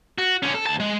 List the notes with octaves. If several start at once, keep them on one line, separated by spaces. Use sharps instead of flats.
F#4
D3 C#4
A4
D2 A5
G#3